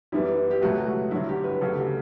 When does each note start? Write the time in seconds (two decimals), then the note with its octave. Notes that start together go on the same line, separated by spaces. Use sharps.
0.12 F#2 E3 G3 B3 E4
0.51 G4
0.62 C#2 B2 F#3 A3 F#4
0.86 F#4
1.11 G2 D3 F#3 E4
1.29 G4
1.44 B4
1.61 D2 C#3 F#3 A4
1.78 G4